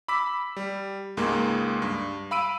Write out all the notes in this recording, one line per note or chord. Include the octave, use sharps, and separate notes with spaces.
B5 D6 E6 B6
G3
C#2 G#2 G#3 A#3
G2
F5 B5 E6 D7 D#7